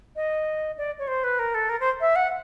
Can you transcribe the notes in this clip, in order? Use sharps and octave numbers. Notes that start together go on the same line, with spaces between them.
D#5
D5
C#5
C5
B4
A#4
A4
A#4
C5
E5
F#5